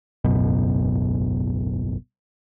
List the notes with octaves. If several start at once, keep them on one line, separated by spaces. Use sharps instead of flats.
G#1 C#2 F#2 B2